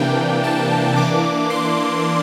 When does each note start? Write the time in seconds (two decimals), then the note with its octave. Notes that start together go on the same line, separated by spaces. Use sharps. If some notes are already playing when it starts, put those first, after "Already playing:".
Already playing: C3 E3 A#3 D4 G5
0.44 A5
0.97 E3 A#3 D4 D6
1.50 C6